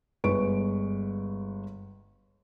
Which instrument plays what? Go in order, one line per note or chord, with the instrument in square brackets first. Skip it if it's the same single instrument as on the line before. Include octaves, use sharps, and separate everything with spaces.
[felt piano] G1 G#3 B4 C#6 D7